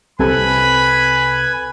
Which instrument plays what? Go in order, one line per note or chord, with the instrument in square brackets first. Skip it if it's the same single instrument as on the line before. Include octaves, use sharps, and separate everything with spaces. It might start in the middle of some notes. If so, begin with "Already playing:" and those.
[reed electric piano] C2 C3 A4 [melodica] B4 G#5 [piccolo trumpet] B5